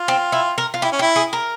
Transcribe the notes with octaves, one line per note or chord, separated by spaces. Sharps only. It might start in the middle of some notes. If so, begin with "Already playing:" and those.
Already playing: F4
C4
E4
A#4
F4
E4 G4
C#4
E4 G4
G#4
A#4